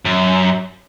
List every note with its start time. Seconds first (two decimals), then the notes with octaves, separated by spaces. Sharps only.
0.05 F#2